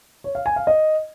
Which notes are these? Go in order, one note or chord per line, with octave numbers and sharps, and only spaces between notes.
C#5
F5
G#5
F5
D#5